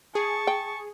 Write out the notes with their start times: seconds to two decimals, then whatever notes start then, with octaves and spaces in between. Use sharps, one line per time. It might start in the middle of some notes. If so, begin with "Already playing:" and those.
0.15 G#4 A5 C#6
0.47 G5